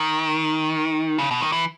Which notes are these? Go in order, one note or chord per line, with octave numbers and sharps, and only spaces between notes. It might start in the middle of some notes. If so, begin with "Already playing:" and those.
Already playing: D#3
C#3
B2
D#3
E3